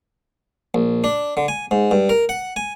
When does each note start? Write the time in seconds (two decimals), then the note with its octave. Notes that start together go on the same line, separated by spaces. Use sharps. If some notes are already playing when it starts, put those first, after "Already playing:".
0.74 A#1
1.04 D4
1.37 D3
1.48 G#5
1.71 G#2
1.91 G2
2.09 A#4
2.29 F#5
2.56 G#5